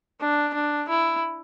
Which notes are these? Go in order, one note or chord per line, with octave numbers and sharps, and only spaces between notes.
D4
D4
E4